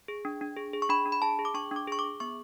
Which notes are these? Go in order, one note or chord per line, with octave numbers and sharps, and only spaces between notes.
G#4
D4
D4
G#4
G#4
C#6
D4 B5
D4
B5
G#4 A5
G#4
D6
D4 C#6
D4 D6
G#4 C#6
D6
G#4
B3 C#6